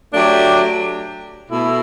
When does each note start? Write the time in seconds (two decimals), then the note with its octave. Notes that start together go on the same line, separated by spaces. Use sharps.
0.13 F#3 A3 D4 G4
1.49 B2 A3 E4